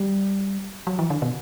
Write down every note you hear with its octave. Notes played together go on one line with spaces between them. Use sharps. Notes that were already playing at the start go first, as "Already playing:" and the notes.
Already playing: G3
F#3
E3
D3
B2